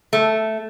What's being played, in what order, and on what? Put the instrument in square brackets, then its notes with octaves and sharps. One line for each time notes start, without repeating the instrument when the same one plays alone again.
[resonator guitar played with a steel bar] A3